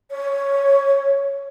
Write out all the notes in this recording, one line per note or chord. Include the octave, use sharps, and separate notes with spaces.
C#5